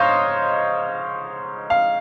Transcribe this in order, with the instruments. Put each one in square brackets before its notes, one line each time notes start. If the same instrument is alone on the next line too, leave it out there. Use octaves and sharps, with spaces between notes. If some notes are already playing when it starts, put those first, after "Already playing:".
Already playing: [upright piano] G#2 C5 C#5 D#5 F5
F5